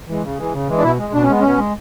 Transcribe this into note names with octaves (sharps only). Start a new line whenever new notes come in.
E3 G#3
C#3
E3 G#3
C#3
E3 G#3
D4
B2 E4
G#3
B2 D4
C#4
G#3 B3
B2 C#4
G#3